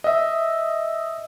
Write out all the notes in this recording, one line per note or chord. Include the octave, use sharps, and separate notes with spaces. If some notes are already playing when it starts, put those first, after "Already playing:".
D#5 E5